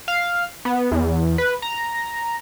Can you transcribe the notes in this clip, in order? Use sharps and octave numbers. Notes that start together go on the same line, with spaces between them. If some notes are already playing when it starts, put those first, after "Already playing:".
F5
B3
E2
B4
A#5